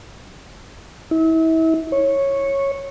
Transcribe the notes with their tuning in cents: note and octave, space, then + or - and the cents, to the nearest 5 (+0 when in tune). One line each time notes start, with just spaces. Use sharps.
E4 -35
C#5 -10